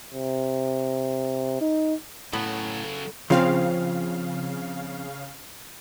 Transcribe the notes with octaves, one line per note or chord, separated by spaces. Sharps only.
C3
D#4
A2 C#3 F#3 B3 A4
C#3 F3 C4 F5